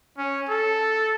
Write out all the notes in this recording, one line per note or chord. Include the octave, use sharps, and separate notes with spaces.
C#4
A4